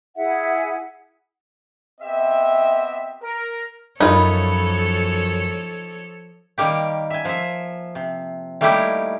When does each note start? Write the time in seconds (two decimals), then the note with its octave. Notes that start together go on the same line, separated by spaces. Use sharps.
0.16 E4 G#4 E5 F#5
2.01 B3 C4 G4 D#5 E5
3.23 A#4
4.01 F#2 F3 D#4 F4 A4 C#5 B5
6.58 D#3 G3 A#3 G4
7.10 E5 G#5
7.25 F3 E5
7.95 C3
8.61 G3 A3 A#3 D#4 E4 G4